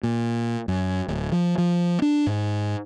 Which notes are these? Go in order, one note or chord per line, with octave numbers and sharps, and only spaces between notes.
A#2
F#2
D1
F3
F3
D4
G#2